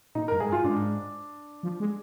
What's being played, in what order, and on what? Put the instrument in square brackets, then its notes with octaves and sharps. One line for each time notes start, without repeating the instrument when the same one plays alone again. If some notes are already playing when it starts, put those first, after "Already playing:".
[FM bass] A#2 [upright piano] D#4
[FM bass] G2 [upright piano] A#4
[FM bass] G#2 [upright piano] G#4
[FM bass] G2
[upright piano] F4
[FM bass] G#2 [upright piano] D4
[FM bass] F3
G#3